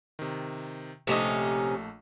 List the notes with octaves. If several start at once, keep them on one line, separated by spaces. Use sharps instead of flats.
C3 D#3
A#1 C3 A3 C#4 D#4 E7